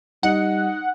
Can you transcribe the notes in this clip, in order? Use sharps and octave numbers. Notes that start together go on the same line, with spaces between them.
G3 D#4 F#5